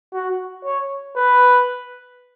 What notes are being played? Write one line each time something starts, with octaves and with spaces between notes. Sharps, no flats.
F#4
C#5
B4